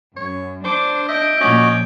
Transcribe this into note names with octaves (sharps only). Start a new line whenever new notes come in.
F#2 C#5
D4 C5 D6
D#5 E5 G6 D7
A#2 F3 C#4 F#4 D#5 D6